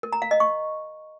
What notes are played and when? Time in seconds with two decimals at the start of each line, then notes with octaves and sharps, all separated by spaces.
0.03 A#4
0.13 A#5
0.22 F5
0.31 D#5
0.40 C#6